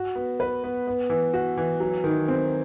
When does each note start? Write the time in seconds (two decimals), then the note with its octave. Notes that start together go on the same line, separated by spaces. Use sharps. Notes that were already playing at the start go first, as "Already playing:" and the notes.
Already playing: F#4
0.15 B3
0.40 B4
0.64 B3
0.87 B3
1.10 E3
1.34 F#4
1.57 E3
1.80 F#3
2.04 D#3
2.28 C4